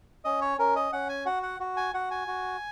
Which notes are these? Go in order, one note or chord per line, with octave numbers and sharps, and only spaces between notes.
C#4 D#5
C#5
C#4 A#4
D#5
C#4 F#5
G#5
F#4 F#5
F#5
F#4
G#5
F#4 F#5
G#5
F#4